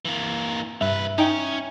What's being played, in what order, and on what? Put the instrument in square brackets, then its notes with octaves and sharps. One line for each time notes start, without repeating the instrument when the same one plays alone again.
[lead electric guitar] E3 A#3
[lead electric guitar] C2 B4 [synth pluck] G2 [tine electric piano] E5
[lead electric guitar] C#4 [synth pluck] D#4 G5